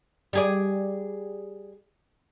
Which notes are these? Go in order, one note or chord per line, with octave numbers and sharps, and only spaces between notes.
G3 G#4 D5